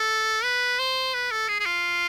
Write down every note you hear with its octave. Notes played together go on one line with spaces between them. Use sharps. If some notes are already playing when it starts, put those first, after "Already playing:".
Already playing: A4
B4
C5
B4
A4
G#4
G#4
F4